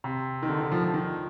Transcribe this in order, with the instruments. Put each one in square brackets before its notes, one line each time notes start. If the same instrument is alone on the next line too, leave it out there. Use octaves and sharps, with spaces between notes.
[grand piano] C3
D#3
D3
D#3
F3
F3
D#3